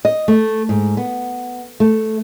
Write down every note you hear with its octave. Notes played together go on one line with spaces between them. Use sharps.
D#5
A3
G#2
B3
A3